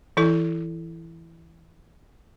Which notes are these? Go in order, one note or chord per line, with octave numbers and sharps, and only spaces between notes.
E3 E4 A4